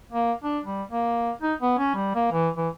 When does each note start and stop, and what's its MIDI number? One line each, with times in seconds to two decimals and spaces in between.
0.12 0.33 58
0.44 0.59 62
0.65 0.83 55
0.91 1.32 58
1.42 1.54 63
1.61 1.78 59
1.78 1.92 61
1.95 2.14 55
2.15 2.29 58
2.32 2.49 52
2.57 2.68 52